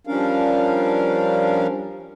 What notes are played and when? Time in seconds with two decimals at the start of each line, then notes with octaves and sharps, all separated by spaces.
0.07 F3 G3 C#4 D4 A#4 F5